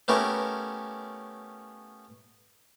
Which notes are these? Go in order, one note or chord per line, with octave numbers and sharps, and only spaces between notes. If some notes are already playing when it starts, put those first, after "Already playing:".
A3 B3 C#4 E4 G4 A#4